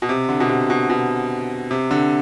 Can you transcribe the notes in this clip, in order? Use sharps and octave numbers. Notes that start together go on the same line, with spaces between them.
B2
C3
D3
B2
C3
B2
B2
C3
D3